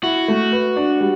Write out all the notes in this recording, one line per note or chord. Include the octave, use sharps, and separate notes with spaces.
E4 F#4
A3
B4
D4
G3